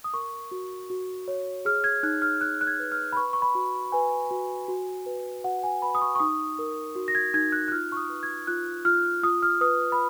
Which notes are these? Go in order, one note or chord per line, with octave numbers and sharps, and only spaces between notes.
D#6
A#4 C#6
F#4
F#4
C#5
G#4 F6
G#6
D#4 F#6
F6
D#4 F#6
F#6
G#6
B4
F6
B5
B4 C#6
C#6
B5
F#4
B4 G#5
F#4
F#4
B4
F#4 F#5
G#5
B4 B5
D#6
C#6
C#6
D#4 D#6
A#4
F#4
A#6
G#6
D#4 G#6
F#6
F#6
F4 F6
C#6
D#6
B4
G#6
F4 F#6
F4 F6
F4 D#6
F6
B4 D#6
B5